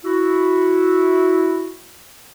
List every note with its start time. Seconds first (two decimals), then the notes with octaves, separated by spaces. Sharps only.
0.05 E4 F#4